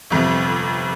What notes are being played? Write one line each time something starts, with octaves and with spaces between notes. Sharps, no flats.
G1 F2 C3